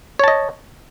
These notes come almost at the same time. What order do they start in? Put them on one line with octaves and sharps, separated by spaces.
C#5 A5 D#5